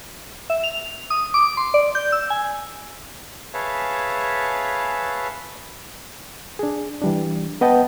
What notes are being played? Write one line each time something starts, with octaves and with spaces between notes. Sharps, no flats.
E5
F7
D#6
D6
C6
D5
G6
E6
G#5
G#4 B4 C#5 E5 F5 A5
D4 G#4
E3 G3 D4
B3 B4 D#5 F#5 G5 A5